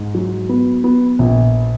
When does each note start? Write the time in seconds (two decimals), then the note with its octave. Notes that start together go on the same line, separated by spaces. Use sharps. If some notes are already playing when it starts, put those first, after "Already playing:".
Already playing: G#2
0.15 F#3
0.49 B3
0.84 B3
1.19 A#1